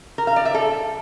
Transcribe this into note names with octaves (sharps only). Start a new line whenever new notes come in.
A#4
F5
D5
E5
A4